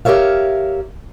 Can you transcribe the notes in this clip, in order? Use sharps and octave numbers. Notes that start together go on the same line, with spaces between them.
G4 A#4 C#5 E5 F5